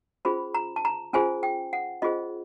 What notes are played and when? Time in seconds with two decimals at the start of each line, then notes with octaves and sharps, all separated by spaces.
0.25 C#4 F4 G#4 C5 B5
0.54 A#5
0.76 A5
0.85 A#5
1.13 C#4 F4 G#4 C5 G#5
1.43 G5
1.73 F#5
2.02 C#4 F4 G#4 C5 D#5